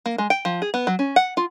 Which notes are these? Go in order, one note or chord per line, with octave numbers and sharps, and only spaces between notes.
A#3
G#3
G5
F3
G#4
B3
F#3
C#4
F#5
F4